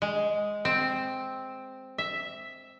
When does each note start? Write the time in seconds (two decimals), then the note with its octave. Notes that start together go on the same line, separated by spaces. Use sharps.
0.02 G#3
0.65 C4
1.98 E5